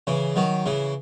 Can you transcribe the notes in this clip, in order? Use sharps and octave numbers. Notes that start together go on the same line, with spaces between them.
C#3 E3
D#3 F#3
C#3 E3